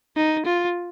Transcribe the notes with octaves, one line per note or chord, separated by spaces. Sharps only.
D#4
F4